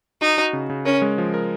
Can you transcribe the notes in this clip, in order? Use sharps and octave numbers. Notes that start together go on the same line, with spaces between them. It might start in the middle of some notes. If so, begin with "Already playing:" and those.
D#4 F#4
F#4
C#3
C#3
C#4 A#4
G#3
F3
A#4